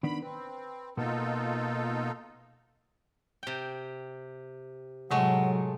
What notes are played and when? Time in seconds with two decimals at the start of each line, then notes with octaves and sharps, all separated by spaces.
0.03 D#3 B3 D4 B5
0.22 C4 B4
0.97 B2 A#3 B3 D#4 F4 A4
3.43 C3 G5
5.11 A2 C3 F#3 G#3 A3 F#5 C#6